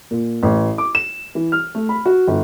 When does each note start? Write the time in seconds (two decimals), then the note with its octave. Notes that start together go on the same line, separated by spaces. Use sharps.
0.11 A#2
0.43 A1
0.78 D6
0.95 E7
1.35 E3
1.52 F6
1.75 A3
1.89 B5
2.06 F#4
2.28 G1